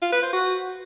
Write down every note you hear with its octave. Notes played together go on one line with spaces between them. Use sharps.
F4
B4
C5
F#4